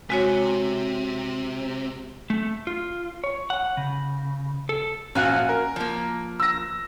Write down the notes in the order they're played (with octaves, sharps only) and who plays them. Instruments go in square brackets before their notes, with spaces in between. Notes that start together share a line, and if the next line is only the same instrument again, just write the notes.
[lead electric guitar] C3 [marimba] G#3 F#4 C#5
[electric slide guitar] A3
F4
C#5
F#5
C#3
A4
[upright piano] A#1 F5 F#6 [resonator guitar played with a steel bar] C#4 F#4 G#5
[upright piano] A#4
[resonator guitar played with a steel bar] F3 A#3
[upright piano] E6 A#6